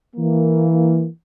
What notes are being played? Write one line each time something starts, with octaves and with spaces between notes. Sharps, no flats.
E3 A#3